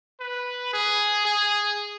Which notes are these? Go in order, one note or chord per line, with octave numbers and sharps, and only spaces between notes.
B4
G#4
G#4